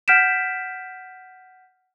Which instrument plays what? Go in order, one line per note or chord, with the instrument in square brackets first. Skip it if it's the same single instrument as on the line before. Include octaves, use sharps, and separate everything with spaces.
[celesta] F#5 F6 G6 B6 D7 E7